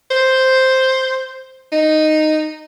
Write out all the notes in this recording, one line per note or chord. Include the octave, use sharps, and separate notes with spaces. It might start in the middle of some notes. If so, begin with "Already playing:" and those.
C5
D#4